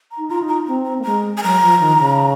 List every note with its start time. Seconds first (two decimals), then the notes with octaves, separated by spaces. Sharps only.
0.11 A#5
0.18 D#4
0.29 F4 A#5
0.42 D#4
0.48 A#5
0.66 C4 A#5
0.85 A#5
0.99 A#3
1.03 G#3 A#5
1.37 G#5
1.43 F#3 A#5
1.62 F3
1.80 D#3
1.99 C#3